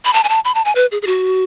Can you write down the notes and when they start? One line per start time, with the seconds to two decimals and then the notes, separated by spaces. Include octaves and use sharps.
0.05 B5
0.13 A5
0.24 G#5
0.29 A5
0.45 B5
0.55 A5
0.65 G#5
0.75 B4
0.92 G#4
1.02 G#4
1.07 F#4